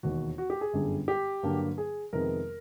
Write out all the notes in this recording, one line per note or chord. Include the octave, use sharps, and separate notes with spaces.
E1 D#2 D#3 F#4
F#4
G4
G#4
G1 F#2 D3 G3
G4
G2 D3 F#3 A#3
G#4
F2 C3 D#3 G#3 B3 A#4